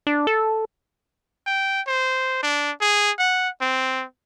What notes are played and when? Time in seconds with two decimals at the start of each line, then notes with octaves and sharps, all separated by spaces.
0.07 D4
0.27 A4
1.46 G5
1.87 C5
2.43 D4
2.81 G#4
3.19 F#5
3.61 C4